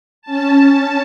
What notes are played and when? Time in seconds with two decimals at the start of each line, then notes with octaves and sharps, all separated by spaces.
0.22 C#4 A5